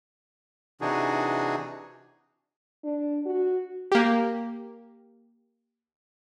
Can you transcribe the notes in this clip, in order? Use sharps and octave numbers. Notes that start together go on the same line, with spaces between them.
C3 E3 D4 D#4 F#4 G#4
D4
F#4
A#3 G4